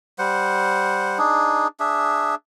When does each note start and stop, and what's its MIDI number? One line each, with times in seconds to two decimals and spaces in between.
0.19 1.18 55
0.19 1.18 72
0.19 1.18 78
1.18 1.67 62
1.18 1.67 63
1.18 1.67 68
1.80 2.35 62
1.80 2.35 68
1.80 2.35 76